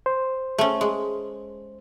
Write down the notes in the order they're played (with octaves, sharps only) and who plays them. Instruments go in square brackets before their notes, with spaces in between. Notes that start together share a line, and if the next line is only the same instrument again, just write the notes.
[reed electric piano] C5
[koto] A3 C#4
G#3